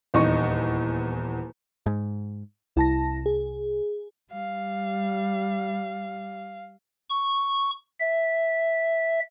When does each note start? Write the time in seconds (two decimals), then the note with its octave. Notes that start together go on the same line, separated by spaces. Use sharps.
0.14 D#1 E2 D#4 C#6
1.86 G#2
2.77 C2 E4 A5 A#6
3.26 G#4
4.32 G3 F5
7.09 C#6
8.00 E5